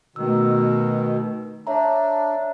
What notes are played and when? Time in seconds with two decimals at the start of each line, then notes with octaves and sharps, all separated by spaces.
0.16 B2 D#3 A3 E6
1.67 D4 C#5 E5 A#5